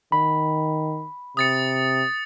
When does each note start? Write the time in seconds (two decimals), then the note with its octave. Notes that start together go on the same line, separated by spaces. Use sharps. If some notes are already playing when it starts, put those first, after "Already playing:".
0.12 D#3 B5
1.37 C3 D#6 A6 C#7